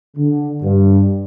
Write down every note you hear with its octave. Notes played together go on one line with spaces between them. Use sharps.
D3
G2